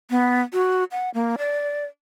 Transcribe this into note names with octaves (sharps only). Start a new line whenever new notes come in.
B3
F#4
F#5
A#3
D5